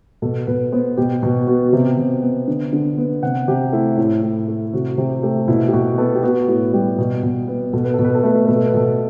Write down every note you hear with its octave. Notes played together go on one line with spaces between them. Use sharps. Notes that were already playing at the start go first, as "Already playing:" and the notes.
B2 A4
B2 B4
B3 C5
B2 G4
B2 F#4
B3 F#4
F#4
C3 G4
C3
B3
D3
D3
B3
C3 F#5
C3 G4
A3 E4
A2
A2
A3
C3 F#4
C3 G4
A3 G4
B2 E4
G4
B2 F#4
B3 A4
G4
B3 F#4
A2 F#4
G3 G4
B2
B2
B3
B2 A4
B4
B2 A4
B4
A4
A3 B4
A4
B2 B4
A4
B4
B2 A4